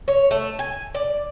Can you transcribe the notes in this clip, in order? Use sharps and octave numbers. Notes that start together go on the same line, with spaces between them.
C#5
A3
G#5
D5